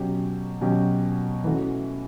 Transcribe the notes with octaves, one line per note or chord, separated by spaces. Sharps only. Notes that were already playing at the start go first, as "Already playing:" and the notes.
Already playing: B2 F#3 C#4 G4
B2 F#3 C#4 G4
E3 A3 C#4 F#4